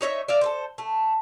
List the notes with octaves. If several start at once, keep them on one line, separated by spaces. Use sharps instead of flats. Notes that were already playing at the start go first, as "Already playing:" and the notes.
D#4 C#5 D#5 E5
D5 E5 F5
A4 B4 C5
A3